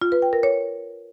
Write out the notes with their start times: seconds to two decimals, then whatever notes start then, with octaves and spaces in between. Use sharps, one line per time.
0.02 F4
0.12 B4
0.22 G5
0.33 A#4
0.43 C#5